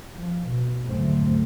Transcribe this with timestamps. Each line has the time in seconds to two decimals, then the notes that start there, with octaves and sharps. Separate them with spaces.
0.14 F3
0.49 B2
0.88 G#1 D2 F#3 A3 C4